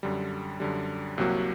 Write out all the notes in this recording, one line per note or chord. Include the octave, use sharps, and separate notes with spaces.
F#2 D3 G3
F#2 D3 G3
C2 C3 F#3 A#3 F#4